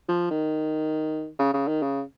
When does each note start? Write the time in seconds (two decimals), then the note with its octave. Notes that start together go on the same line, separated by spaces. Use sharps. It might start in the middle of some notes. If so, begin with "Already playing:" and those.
0.08 F3
0.31 D#3
1.39 C#3
1.54 C#3
1.68 D#3
1.82 C#3